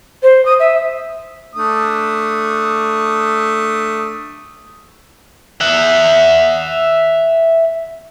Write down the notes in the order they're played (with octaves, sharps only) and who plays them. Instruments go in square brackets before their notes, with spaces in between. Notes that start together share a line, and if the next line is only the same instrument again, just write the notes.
[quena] C5
D#6
E5
[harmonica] A3 D4 D#6
[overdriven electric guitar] E5 F#5